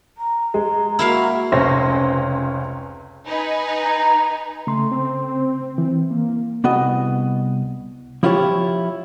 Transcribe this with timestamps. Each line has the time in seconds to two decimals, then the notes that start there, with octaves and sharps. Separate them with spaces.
0.18 A#5
0.54 G#3
0.99 A#3 E4 F#4 A#4 F5
1.52 F1 C#2 C#4 C5 A#6
3.26 D#4 B4 G#5
3.83 A#5
4.67 C#3 A3 C6
4.91 C4
5.78 E3
6.11 A#3
6.64 C2 B3 F#4 D#5
8.23 F3 E4 F4 G4 C#5